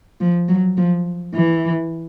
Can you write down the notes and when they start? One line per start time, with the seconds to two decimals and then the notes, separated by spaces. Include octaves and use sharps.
0.20 F3
0.49 F#3
0.77 F3
1.34 E3